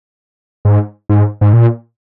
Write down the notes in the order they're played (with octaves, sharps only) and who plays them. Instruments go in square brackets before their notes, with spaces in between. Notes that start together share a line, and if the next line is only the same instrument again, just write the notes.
[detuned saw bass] G#2
G#2
G#2
A#2